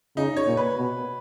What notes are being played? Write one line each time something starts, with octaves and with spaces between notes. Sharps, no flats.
C#3 D#4
C#5
A#2
B4
B2